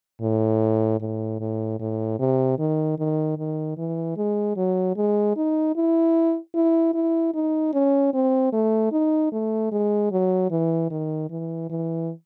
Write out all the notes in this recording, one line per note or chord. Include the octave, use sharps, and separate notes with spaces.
A2
A2
A2
A2
C3
D#3
D#3
D#3
E3
G#3
F#3
G#3
D#4
E4
E4
E4
D#4
C#4
C4
A3
D#4
A3
G#3
F#3
E3
D#3
E3
E3